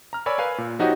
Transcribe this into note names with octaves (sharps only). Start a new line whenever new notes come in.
A#5 F6
A#4 C#5 D5 G#5 B5 E6
A#4 B4 F5 G#5
A#2
F3 D#4 F#4 G4 C#5 D#5